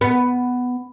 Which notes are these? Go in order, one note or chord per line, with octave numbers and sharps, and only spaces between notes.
B3